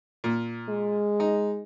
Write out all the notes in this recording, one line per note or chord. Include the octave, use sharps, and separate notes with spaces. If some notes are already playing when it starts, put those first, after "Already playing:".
A#2
G#3
D#4